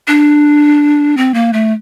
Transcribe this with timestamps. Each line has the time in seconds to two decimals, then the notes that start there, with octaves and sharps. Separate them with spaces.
0.08 D4
1.17 C4
1.34 A#3
1.53 A3